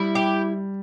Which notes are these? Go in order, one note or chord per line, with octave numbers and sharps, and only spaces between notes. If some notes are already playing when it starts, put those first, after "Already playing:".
Already playing: G3 E4
G4